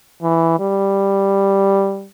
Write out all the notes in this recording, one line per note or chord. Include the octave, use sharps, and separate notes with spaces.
E3
G3